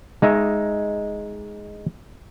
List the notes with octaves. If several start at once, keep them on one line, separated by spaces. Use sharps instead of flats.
G#3 D#4 E5